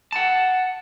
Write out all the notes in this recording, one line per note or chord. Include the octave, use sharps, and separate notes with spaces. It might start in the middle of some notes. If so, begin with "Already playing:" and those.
F#5 A5